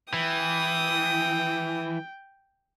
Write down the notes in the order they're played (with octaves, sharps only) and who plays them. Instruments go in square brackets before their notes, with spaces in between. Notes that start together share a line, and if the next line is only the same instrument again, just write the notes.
[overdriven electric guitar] E3 [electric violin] G5 [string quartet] D#6